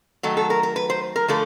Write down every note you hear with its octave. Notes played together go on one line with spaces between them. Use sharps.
D#3 F#3 A3 A4
A4
A#4
A#4
B4
C5
A#4
D3 F3 A3 A4